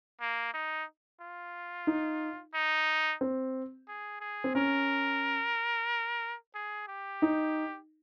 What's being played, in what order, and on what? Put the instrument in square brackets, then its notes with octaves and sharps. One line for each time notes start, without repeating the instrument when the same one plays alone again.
[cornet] A#3
D#4
F4
[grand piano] D#4
[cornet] D#4
[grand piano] C4
[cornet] G#4
G#4
[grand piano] C4
[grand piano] C#4 [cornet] A#4
[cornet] G#4
G4
[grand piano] D#4